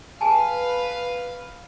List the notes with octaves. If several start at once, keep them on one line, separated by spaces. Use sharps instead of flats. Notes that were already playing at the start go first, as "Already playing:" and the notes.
G#4 B4 F5 G#5 A5